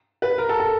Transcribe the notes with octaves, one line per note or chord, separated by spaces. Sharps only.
B4
A#4
A4
A4